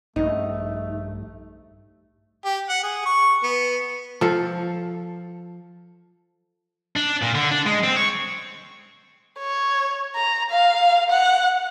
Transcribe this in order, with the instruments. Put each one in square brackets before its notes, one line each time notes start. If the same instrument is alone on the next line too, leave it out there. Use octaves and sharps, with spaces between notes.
[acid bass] A#1 [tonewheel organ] G2 [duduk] A3 [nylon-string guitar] D#4
[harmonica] G4
F#5
G#4
C#6
B3
[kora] F3 A4
[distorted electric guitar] D4
A#2
D3
D4
G#3
C4
C#5
[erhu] C#5
A#5
F5
F#5